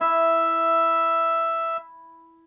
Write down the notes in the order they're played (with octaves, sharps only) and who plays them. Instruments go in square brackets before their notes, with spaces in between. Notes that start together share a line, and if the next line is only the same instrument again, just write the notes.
[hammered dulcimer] E4 [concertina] E5